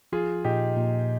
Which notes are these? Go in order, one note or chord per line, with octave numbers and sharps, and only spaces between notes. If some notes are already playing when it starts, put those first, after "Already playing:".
F3 F4 G#4
A#2 D#4 G4
A#2